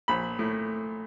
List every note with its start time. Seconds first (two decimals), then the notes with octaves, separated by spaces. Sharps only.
0.08 A#1 B5
0.39 A2